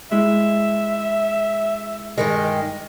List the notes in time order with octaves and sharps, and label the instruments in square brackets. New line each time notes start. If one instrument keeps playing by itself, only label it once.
[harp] G#3 E4 [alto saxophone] E5
[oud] G2 D#3 G#3